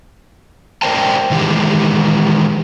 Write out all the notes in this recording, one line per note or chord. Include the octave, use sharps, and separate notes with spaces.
A#4 C5 D5 G5 A5
D#3 E3 G#3 G4 G#4